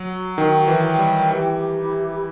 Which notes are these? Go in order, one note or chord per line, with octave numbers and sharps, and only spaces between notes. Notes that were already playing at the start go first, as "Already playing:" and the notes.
Already playing: F#3 F#4
D#3 G5
E3
G5
G3
E3 G4
E4